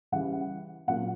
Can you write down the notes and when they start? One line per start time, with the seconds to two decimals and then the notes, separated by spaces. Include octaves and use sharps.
0.12 C#3 E3 G3 F#5
0.87 A#2 F#3 A#3 F#5